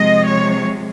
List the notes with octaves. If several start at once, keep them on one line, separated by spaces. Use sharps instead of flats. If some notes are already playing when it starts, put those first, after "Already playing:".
Already playing: C3 F3 G#3 D#5
C#5